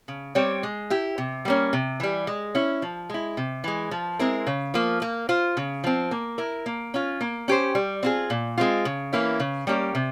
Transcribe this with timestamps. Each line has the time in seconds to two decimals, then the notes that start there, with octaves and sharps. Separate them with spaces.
0.08 C#3
0.35 G3 C4 G4 C#5
0.63 G#3
0.90 E4 G4
1.18 C3
1.45 G3 A#3 C#4
1.73 C3
2.00 E3 G3
2.27 G#3
2.55 C#4 E4
2.82 F3
3.10 G#3 E4
3.37 C3
3.64 E3 G#3
3.91 F3
4.19 G#3 C4 E4 A#4
4.47 C#3
4.74 F3 A#3
5.02 A#3
5.29 F4 C5
5.57 C#3
5.84 F3 C4
6.11 A#3
6.38 E4 A#4
6.66 A#3
6.94 C#4 F4
7.21 A#3
7.48 C#4 G4 C5
7.75 G3
8.03 C4 F4 G#4
8.30 A#2
8.58 G#3 C4 F4
8.85 C#3
9.13 E3 A#3 C#4 E4
9.40 C#3
9.67 G3 A#3 C#4 G4
9.95 C3